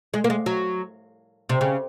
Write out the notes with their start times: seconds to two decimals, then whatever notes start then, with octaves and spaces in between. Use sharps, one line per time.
0.14 G#3
0.24 A#3
0.30 G#3
0.46 F#3
1.49 C3
1.61 C#3